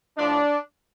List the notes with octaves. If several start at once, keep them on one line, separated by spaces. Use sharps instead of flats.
A2 F3 D4